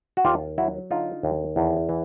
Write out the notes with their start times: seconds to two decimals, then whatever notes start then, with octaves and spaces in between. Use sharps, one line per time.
0.17 F#4
0.25 D#2 F4 G4
0.58 F#3 E4 F#4
0.91 D3 D#4 F4
1.23 D#2
1.56 E2
1.89 E3